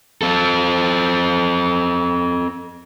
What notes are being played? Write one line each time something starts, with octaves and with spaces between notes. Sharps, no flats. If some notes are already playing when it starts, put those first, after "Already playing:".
C4 A4